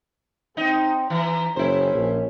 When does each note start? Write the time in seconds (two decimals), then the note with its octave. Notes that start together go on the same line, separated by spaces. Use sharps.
0.57 C4 D#4
1.10 E3 A#5
1.56 F#1 C#4 E4 C5
1.93 A#1